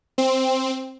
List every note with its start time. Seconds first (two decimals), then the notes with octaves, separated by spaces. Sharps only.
0.18 C4